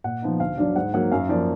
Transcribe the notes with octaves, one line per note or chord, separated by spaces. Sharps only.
A#2 F#5
F3 B3 D#4
D2 F5
D3 F#3 D4 D5
G#2 F#5
F#3 A#3 F#5
F#2 F5
F3 A#3 D5